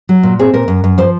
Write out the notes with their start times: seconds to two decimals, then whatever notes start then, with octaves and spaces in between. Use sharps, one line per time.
0.09 F#3
0.23 A#2
0.39 C4 G#4
0.54 A#2 A#4
0.68 F#2
0.84 F#2
0.98 F3 C5